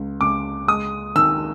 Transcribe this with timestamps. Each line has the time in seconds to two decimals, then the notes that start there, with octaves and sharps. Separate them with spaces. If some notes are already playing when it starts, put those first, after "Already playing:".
Already playing: C#2
0.21 C#2 D6
0.67 G#3 D#6
1.15 D#3 E6